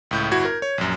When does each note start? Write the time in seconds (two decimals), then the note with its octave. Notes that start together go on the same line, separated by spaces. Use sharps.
0.11 C#2 A2 G6
0.31 G1 E4 F#4 G#6
0.45 A#4
0.62 C#5
0.78 A#1 F#2